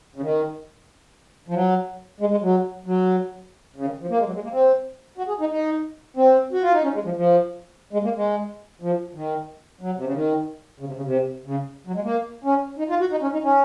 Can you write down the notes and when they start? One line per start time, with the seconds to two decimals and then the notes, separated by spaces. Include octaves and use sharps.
0.16 C#3
0.21 D#3
1.48 F3
1.54 F#3
2.20 G#3
2.31 G#3
2.42 F#3
2.86 F#3
3.76 C#3
3.85 D#3
4.01 F3
4.10 A#3
4.19 G#3
4.27 F#3
4.35 G#3
4.43 A#3
4.52 C4
5.18 F#4
5.28 G#4
5.40 D#4
5.50 D#4
6.17 C4
6.52 F#4
6.63 F4
6.73 D#4
6.83 C#4
6.94 G#3
7.05 F3
7.16 F3
7.93 G#3
8.04 A#3
8.16 G#3
8.82 F3
9.15 D#3
9.81 F#3
9.96 C3
10.04 C#3
10.14 D#3
10.80 C#3
10.87 C3
10.96 C#3
11.05 C3
11.46 C#3
11.87 F#3
11.95 G#3
12.04 A#3
12.44 C#4
12.78 D#4
12.90 F4
13.00 F#4
13.11 D#4
13.22 C#4
13.33 D#4
13.44 C#4